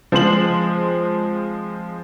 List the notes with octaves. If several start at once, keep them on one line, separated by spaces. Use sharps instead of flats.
F3 G#3 C4 C6 E7 F#7